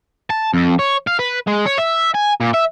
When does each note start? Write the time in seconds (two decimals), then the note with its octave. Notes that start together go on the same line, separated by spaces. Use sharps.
0.30 A5
0.53 F2
0.79 C#5
1.07 F5
1.19 B4
1.48 G#3
1.66 C#5
1.78 E5
2.14 G#5
2.41 A#2
2.54 E5